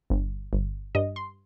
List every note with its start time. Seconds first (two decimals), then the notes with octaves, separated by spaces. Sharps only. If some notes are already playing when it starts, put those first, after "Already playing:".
0.10 G1
0.53 G1
0.95 G2 D#5
1.16 C6